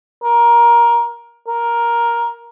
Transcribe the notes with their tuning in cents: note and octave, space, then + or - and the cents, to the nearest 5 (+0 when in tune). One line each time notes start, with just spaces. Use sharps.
A#4 +15
A#4 +10